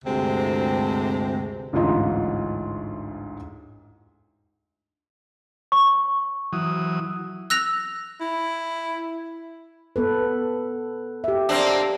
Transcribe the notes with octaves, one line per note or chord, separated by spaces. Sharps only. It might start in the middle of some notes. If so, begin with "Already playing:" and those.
D2 G2 C3 G#3 C4
A1 D2 G#2 F4 D#5 C6
C#6
E3 F#3 D#6
E6 F#6 A#6 F7
E4
B3 A4 B4
G4 E5
A#3 C4 D4